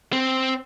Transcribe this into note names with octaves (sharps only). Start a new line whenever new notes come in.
C4